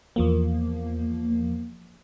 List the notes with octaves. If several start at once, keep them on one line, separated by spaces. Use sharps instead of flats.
E2 F3 A#3